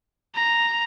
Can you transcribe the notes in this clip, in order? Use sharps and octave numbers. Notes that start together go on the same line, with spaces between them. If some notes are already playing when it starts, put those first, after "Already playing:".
A#5